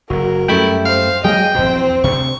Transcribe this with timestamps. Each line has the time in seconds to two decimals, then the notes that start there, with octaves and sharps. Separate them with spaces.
0.10 F#1 F#3 F#4 A#4
0.48 F#2 G3 A3 E4 G5
0.85 C5 F5
1.24 F#3 G#3 A#3 G#4 D#5 F5 G5
1.55 A#1 E2 F#3 C4 C5
2.04 D2 C3 C#6